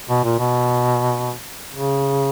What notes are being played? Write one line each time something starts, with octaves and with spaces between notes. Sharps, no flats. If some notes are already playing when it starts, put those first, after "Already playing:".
B2
A#2
B2
C#3